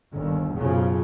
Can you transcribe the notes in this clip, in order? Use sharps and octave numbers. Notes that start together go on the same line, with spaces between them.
G1 D#2
B1 F#2 C#3 F3